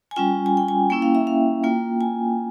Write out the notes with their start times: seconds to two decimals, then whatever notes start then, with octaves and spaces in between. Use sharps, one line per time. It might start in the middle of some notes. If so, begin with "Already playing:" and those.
0.11 G#5
0.16 G3 C#4 F4 G5
0.46 G#5
0.57 G5
0.68 G#5
0.90 A#3 C#4 E4 G5
1.02 F5
1.15 E5
1.27 F5
1.63 A#3 F4 G5
2.01 G#5